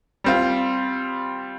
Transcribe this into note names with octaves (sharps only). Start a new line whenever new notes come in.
G3 C4 F4